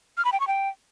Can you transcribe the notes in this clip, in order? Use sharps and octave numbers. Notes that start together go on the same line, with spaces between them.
F6
B5
G5
C#6
G5